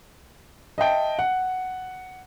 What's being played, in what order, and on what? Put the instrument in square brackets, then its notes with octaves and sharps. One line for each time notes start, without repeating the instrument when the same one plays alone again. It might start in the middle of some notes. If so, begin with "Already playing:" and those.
[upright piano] D#5 E5 G5 A5
F#5